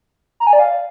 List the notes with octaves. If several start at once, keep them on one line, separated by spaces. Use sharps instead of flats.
A#5
G#5
D5
F5